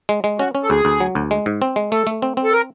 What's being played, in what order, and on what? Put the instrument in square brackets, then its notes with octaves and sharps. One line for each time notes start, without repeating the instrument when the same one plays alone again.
[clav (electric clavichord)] G#3
G#3
[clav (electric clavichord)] C#4 [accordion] F#4
[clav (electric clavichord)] C#4
[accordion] A4
[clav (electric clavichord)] D2 [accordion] G#4
[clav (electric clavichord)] D2
F#3
D2
G#3
G#2
C4
G#3
[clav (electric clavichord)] A3 [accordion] A4
[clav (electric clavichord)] A3
C4
C4
[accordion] A4
A#4